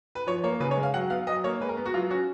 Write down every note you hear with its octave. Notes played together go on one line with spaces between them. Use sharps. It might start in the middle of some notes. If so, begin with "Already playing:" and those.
B4
F3 C#5
A#3 C#5
C#3 B4
C#5
G#3
F5
F#3 F#5
B3 F5
F#3 D#5
A#3 C#5
G#3 B4
A#4
B3
F#4
F#3 F4
C#4 F#4